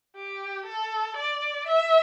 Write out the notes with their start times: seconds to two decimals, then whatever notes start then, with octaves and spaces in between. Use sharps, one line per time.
0.15 G4
0.66 A4
1.17 D5
1.67 E5